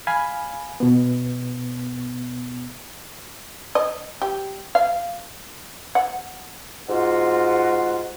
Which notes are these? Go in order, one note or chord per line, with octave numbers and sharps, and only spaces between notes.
F5 G#5 B5
B2 B3
D#5
G4
F5
F#5
G#2 F4 F#4 F#5